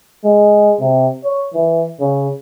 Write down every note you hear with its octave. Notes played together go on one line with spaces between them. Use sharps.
G#3
C3
C#5
E3
C#3